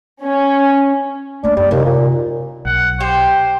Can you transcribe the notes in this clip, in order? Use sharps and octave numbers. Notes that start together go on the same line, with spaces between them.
C#4
A3 A#3 D4
F#2 G3
D#2 C3
A#2
B1 F#5
G4 C5